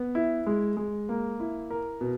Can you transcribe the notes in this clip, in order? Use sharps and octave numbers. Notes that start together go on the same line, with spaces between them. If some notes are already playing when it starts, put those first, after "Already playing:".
Already playing: B3
E4
G#3
G#3
A#3
E4
A#4
B2